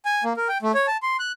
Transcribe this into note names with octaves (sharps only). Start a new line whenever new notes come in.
G#5
A#3
A#4
G5
A3
C#5
A5
C6
F#6